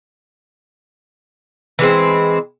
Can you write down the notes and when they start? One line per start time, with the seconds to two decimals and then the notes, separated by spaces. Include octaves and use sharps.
1.79 E3 G#3 C4